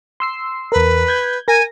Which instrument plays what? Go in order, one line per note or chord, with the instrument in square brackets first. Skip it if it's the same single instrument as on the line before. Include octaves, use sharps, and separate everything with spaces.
[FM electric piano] C6 E6 C7
[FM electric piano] E2 A#4 [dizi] B4
[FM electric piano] G6 G#6
[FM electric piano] A#4 A#6 [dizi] G#5